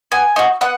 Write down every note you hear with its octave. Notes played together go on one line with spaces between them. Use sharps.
B3 G#5
D#4 F#4
B3 F#5